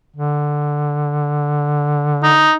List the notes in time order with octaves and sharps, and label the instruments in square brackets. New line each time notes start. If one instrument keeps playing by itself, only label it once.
[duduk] D3
[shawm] D#4